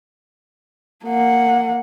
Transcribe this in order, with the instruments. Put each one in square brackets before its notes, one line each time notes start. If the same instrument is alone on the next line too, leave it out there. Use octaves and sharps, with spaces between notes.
[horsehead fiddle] A#3 F#5